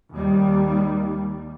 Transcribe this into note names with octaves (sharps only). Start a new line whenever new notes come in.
D#2 D#3 G3